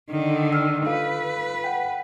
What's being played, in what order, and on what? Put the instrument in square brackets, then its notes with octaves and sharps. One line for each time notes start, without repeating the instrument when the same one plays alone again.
[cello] D3 D#3
[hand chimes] E6 F6
[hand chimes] F4 A4 F5 [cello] B4
[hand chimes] F#5 G5